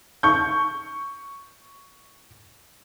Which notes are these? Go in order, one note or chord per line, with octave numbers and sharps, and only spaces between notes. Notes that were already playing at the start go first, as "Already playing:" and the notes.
C#6 G6